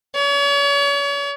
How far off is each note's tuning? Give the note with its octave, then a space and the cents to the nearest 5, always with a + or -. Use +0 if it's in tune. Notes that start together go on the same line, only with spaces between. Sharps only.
C#5 +40